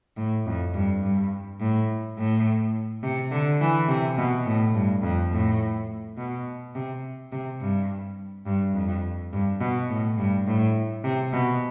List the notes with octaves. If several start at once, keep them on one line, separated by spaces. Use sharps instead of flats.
A2
F2
G2
G2
A2
A2
C3
D3
E3
C3
B2
A2
G2
F2
A2
B2
C3
C3
G2
G2
F2
G2
B2
A2
G2
A2
C3
B2